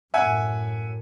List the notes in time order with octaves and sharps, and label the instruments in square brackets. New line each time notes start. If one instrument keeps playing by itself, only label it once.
[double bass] F#2 A2 [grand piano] E5 F#5 G#5